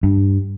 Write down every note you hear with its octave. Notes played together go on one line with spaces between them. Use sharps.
G2